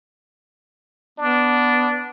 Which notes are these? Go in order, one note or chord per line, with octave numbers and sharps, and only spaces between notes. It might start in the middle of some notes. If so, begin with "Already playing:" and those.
B3 D4